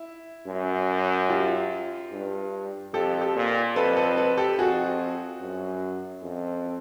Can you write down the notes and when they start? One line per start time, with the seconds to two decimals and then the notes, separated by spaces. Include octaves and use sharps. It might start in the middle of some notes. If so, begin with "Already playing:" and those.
Already playing: E4
0.48 F#2
1.29 F4 G4
2.12 G2
2.93 F2 G4 A4
3.21 G4 A4
3.35 A#2
3.76 F2 A4 B4
3.97 A4 B4
4.17 A4 B4
4.37 G4 A4
4.59 F2 F#4 G#4
5.41 F#2
6.23 F2